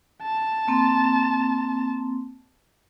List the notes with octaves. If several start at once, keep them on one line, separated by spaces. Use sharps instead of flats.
A5
A#3 C4